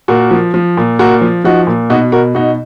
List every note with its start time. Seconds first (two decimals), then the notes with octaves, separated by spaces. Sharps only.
0.08 A#2 F#4 A#4
0.31 F3
0.54 F3
0.77 A#2
0.99 A#2 F#4 A#4
1.21 F3
1.44 F3 D#4 F#4
1.67 A#2
1.90 B2 D#4 F#4
2.12 B2 F#4 A#4
2.35 B2 D#4 F#4